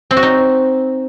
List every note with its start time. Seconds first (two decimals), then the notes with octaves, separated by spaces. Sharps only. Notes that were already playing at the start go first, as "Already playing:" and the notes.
0.11 C4
0.17 F#4
0.23 D#4